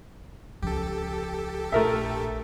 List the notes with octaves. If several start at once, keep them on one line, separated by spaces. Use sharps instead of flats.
C#2 F3 G4 A4
A#1 A3 A#4 E5